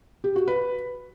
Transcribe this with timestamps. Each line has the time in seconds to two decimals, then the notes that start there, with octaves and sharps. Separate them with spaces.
0.24 G4
0.36 F#4
0.48 B4